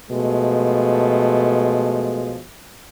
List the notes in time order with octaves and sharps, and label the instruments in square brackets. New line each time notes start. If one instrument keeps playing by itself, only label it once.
[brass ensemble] B2 F3 G#3 A3